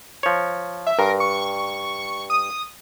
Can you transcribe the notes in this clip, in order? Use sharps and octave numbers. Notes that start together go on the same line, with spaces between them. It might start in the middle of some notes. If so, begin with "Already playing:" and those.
F3 C#5
E5
G2 A#4
C#6
D#6